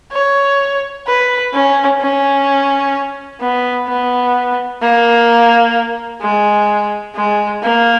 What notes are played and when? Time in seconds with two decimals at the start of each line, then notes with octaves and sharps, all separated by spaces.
0.12 C#5
1.07 B4
1.53 C#4
2.00 C#4
3.41 B3
3.88 B3
4.81 A#3
6.22 G#3
7.16 G#3
7.63 A#3